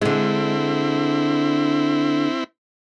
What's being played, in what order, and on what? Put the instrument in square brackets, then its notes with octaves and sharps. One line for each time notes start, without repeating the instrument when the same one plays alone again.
[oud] D3 G#3 [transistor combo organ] C4 E4